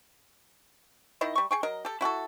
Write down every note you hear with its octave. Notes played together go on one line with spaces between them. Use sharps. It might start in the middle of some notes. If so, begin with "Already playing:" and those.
D#3 E4 D#5
G3 C#6
G#4 G5 C#6
F#3 A#4 D#5
G4 A4
E4 F#4 G4 A4